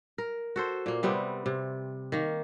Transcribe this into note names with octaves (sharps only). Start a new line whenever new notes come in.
A#4
F#4 A4 C5
A#2 A#3
C3 G3 B3 C4
C3
D#3 A#3